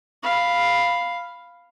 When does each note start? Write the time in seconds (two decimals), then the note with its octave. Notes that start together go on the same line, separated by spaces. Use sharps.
0.23 F5 B5